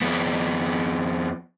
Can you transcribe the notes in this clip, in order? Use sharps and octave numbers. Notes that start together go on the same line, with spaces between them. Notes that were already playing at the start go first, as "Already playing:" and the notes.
F2 B3